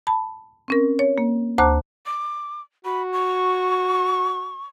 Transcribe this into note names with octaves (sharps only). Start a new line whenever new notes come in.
A5 B5
C4 C#4 A#4
C#5
A#3
D2 C5 A5 A#5 D6 F#6
D6
F#4 B5
C#6